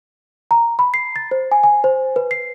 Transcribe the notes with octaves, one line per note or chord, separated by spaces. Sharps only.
A#5
B5
C7
A6
C5
G#5
G#5
C5
B4
C7